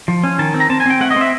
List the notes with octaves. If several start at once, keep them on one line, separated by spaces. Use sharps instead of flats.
F3
C#4
D#3 A5
C4
A#5
C4 A5
G#5
C4 G5
A3 F#5
D#5
C4 E5